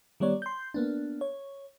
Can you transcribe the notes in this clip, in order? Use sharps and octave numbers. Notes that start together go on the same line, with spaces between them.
D#3 G3 B3 C#5 D5
C6 G6
A#3 B3 D4
C#5